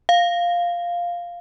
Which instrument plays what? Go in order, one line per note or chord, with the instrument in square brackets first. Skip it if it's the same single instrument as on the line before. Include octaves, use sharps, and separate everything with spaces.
[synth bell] F5